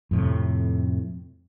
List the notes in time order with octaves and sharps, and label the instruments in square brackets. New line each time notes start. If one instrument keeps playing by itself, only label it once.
[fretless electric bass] F2 A2 C3